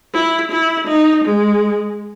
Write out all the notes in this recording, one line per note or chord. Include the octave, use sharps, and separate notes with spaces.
E4
E4
D#4
G#3